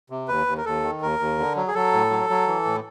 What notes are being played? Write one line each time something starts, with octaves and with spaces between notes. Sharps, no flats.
C3
D#2 B4
D#2
A#4
D#2 A4
D#3
D#2 A#4
D#2
D3
F#3
G#4
F#3 A4
A2
F#3
F#3
E3
A2